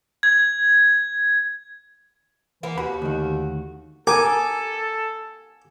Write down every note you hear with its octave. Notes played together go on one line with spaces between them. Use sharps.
G#6
E3 A#3 B3
D#2 F#4 B5
D2 D#3
A4 A#4 G#5 D6 D#6